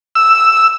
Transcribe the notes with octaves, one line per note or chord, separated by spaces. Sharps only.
E6